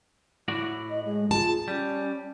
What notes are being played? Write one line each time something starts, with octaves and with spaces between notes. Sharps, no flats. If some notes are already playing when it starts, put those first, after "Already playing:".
A2 E4 F#4 D5
D#5
G#3 G#4
F4 G#4 A5
G3 C#4 D5